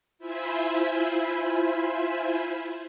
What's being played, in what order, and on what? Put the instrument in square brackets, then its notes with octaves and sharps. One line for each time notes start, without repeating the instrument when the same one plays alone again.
[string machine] E4 F4 C5 E5 G#5 B5